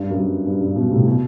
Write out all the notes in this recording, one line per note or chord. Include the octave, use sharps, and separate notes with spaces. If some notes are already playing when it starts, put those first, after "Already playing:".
Already playing: G2
F#2
G2
G2
G2
G2 B2
A2 C3
B2